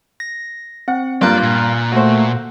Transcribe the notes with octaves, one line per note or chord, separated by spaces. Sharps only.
A#6
C4 F#5
G2 A#3 F4 D5 C6 F#6 G6
A#2
A3 F#4 C5